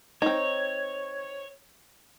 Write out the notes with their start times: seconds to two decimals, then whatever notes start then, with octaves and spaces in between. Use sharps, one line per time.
0.22 C4 D#4 C#5